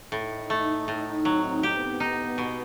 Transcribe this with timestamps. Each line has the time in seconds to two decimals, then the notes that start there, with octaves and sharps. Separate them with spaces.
0.12 A2 D#4
0.50 A3
0.88 A2 D#4
1.25 F#3 C4
1.63 B3 G4
2.00 D#4
2.38 B2